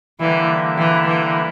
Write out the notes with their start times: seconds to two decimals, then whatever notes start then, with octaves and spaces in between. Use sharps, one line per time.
0.20 D3 E3 G3 A#3 E4
0.78 E3
1.07 E3